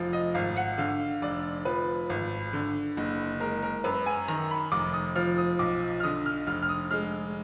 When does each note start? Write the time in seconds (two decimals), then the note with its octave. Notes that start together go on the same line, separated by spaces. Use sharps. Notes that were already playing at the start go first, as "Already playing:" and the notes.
Already playing: F1 F3
0.13 D#5
0.34 G#1 F5
0.57 F#5
0.78 D3 F5
1.22 F1 D5
1.65 F3 B4
2.10 G#1
2.53 D3
2.97 F#1
3.40 G#3 A#4
3.63 A#4
3.84 F#2 B4
4.06 G#5
4.28 D#3 A#5
4.51 B5
4.72 F1 D6
4.94 D#6
5.15 F3 F6
5.38 D#6
5.59 B1 D6
6.00 F6
6.03 D3 D#6
6.26 F6
6.47 F1 F6
6.62 F6
6.69 D#6
6.91 G#3 F6